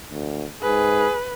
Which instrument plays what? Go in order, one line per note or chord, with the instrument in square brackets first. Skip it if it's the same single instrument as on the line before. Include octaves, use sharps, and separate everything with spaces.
[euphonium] D2
[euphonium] G#2 [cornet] G#4 [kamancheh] B4